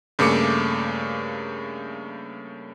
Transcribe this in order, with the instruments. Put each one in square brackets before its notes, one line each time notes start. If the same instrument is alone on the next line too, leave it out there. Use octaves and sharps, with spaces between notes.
[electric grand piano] G2 C#3 A3 A#3 D6 C#7